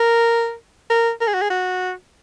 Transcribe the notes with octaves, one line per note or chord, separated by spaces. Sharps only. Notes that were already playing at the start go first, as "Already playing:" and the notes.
Already playing: A#4
A#4
A#4
G#4
F#4
G#4
F#4